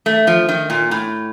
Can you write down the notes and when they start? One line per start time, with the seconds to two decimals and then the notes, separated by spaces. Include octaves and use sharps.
0.06 A3
0.27 F3
0.49 D#3
0.70 A#2
0.91 A2